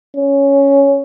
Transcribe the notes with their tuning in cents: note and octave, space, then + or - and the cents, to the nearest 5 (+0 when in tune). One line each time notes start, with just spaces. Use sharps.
C#4 +5